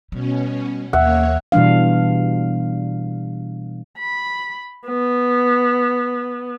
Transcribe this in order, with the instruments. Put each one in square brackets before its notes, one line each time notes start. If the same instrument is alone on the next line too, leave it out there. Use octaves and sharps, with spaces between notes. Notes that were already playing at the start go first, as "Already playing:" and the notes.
[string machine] B2 C#4 [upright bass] G3
[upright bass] D#2 E3 [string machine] A#3 C#5 [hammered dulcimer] E5 [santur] F#5
[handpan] B2 E3 G3 D4 F5
[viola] B5
B3